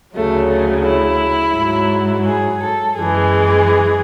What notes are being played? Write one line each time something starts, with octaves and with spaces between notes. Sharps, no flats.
D2 C#3 F#3 A3
A3
E4
G#2 F#3
G#4
A4
F#2 E3 G#3 G#4